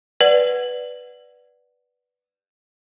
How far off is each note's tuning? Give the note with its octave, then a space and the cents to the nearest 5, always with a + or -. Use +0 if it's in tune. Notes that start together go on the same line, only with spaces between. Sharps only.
B4 +0 D5 +0 F#5 +0